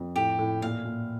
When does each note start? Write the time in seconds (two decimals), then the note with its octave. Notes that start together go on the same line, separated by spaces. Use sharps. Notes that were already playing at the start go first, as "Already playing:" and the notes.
Already playing: F2
0.16 A2 G4
0.39 A2
0.62 A#2 F5
0.85 A#2